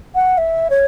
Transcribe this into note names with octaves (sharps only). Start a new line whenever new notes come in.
F#5
E5
C#5